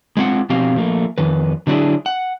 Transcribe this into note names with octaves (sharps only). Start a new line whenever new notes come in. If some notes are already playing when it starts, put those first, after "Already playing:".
G#3 C4 F4 F#5
B2 F3 C4 G4 F5
F3 A3 A#3
F2 D#3 B4
D3 F#3 C#4 D4 E4 G#4
F#5